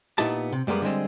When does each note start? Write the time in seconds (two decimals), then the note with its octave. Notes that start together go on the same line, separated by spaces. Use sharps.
0.18 A#2 B3 D#4 E4 G4 A5
0.52 C3
0.67 F#2 G3 G#3 A#3 B3
0.82 D3 G3 G#3 C4